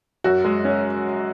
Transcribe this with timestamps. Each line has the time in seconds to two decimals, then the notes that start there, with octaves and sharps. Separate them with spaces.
0.24 F#2 F#4
0.44 G#3
0.65 C#4